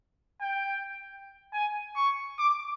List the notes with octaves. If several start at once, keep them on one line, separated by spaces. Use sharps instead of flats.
G5
G#5
C#6
D6